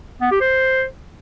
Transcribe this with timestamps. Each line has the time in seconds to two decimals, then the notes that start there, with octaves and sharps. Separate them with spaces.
0.21 B3
0.31 G4
0.41 C5